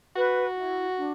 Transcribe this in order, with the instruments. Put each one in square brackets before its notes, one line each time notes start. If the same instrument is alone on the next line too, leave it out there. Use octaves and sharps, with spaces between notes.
[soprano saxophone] F#4 [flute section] B4
[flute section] E4
D4